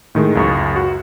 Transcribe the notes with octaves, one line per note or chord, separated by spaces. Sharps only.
A2 D#3 G#3
C#2 F#2 C#6
F#4